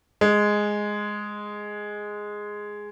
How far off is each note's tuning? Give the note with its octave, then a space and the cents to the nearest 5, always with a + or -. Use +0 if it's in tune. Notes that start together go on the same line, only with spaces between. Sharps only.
G#3 +0